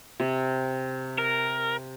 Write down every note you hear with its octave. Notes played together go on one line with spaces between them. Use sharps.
C3
A#4